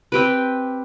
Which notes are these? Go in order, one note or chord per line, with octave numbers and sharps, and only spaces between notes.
C4 G4 B4